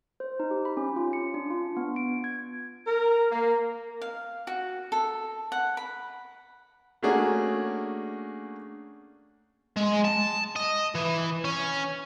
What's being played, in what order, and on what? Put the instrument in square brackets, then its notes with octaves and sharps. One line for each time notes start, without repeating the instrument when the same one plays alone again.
[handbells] C5
D#4
G4
B5
C#4
F4
C#7
D4
F4
B3
D7
G#6
[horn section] A#4
A#3
[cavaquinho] F5
F#4
A4
F#5
B5
[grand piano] A3 A#3 C#4 D4 F#4 G#4
[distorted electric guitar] G#3
A5
D#5
E3
C#4